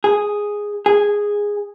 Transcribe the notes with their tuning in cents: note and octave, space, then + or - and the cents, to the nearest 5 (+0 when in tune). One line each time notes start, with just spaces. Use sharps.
G#4 -5
G#4 -10